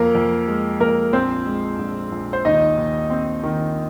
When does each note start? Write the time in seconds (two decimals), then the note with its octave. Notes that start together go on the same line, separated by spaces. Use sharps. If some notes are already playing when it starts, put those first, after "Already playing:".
Already playing: F2 A#3 A#4
0.15 F2
0.48 G#3
0.80 F2 A#3 A#4
1.13 A#1 C4 C5
1.46 G#3
1.79 A#1
2.12 A#1
2.33 C5
2.45 D#2 D#4 D#5
2.77 D#2
3.10 C4
3.43 D#3